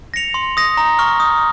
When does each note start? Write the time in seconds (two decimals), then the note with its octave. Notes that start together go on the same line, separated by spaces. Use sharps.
0.14 A#6 C#7 F7
0.34 C6
0.57 D#6 A#6
0.77 A#5
0.99 C#6 F6
1.20 D#6